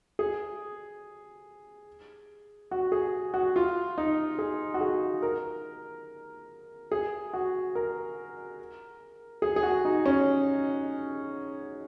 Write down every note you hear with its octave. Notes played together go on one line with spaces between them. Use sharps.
G#4
F#4
G#4
F#4
F4
D#4
G#4
F#4
G#4
A#4
G#4
F#4
A#4
G#4
G#4
F#4
D#4
C#4